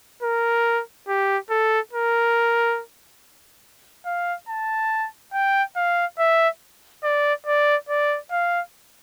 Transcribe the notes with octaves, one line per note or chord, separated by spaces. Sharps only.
A#4
G4
A4
A#4
F5
A5
G5
F5
E5
D5
D5
D5
F5